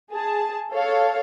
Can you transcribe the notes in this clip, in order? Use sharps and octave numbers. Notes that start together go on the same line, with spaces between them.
G#4 A5
A4 C#5 F5